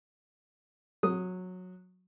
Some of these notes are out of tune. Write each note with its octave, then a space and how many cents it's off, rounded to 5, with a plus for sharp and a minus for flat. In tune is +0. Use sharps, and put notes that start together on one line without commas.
F#3 -15 D#6 +0